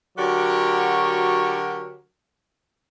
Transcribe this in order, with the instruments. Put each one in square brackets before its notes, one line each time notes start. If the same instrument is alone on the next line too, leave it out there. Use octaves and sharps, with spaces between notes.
[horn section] D3 F#3 F#4 G4 A#4 C#5